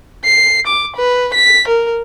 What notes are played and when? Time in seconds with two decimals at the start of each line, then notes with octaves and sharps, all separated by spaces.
0.25 C7
0.67 D6
0.96 B4
1.34 B6
1.68 A#4